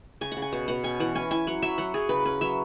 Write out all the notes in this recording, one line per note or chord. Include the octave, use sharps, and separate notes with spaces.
C#3 G#5
F#5
C#3
G#5
B2 F#5
B2 F#5
C#4 G#5
E3 F#5
C#4 G#5
E4 G#5
F#3 F#5
F#3 E5
F#3 F#5
F#3 G#4
C#3 B4
C#4 B4
F#3 E5